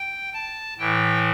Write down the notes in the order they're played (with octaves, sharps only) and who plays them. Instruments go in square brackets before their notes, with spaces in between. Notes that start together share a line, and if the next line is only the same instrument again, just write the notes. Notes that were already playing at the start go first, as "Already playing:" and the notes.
Already playing: [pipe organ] G5
A5
A2 E3 G5